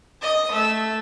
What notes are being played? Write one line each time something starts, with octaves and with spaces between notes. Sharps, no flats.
D#5 D#6
A3 E6